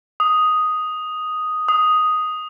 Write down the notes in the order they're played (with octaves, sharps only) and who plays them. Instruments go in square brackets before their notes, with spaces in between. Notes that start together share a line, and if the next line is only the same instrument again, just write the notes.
[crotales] D#6
D#6